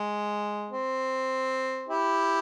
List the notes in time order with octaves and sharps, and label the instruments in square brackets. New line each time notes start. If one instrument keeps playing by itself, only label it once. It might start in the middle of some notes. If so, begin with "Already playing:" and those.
Already playing: [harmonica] G#3
C4
E4 G4